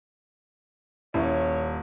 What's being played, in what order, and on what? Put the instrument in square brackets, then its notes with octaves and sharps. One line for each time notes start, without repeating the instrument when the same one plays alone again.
[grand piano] D#1 [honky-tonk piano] C#4 E5 [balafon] E4 [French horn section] C#5